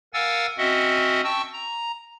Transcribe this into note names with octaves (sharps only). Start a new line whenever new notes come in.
A#4 F5 F#5 G#5 E6 A6
C4 C#4 F#4 D#5 E5 F#5
G5 A5 C#6 E6
A#5